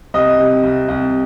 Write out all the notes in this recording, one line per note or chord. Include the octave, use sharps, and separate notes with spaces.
C2 D#5
C3
C2
C2